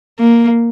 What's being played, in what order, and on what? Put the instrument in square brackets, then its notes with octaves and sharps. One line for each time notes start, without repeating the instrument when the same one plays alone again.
[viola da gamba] A#3